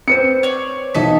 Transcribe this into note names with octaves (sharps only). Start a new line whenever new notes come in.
C4 B4 C5 C#7
C#5 D5
B1 D#3 E3 A4 D#5 E5 B6